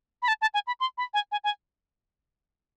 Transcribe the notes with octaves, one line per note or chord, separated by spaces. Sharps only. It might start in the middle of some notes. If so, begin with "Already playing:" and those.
B5
A5
A5
G#5
B5
C6
B5
G#5
G#5
G#5